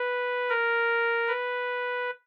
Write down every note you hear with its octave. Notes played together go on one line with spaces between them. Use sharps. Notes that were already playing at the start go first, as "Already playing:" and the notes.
Already playing: B4
A#4
B4